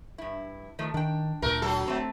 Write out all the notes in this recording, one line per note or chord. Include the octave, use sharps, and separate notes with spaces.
G2 E4
D#3 F3 A3
D#3 D4 G5
D2 A#2 A3 A#4
F#3 A4
A3 C4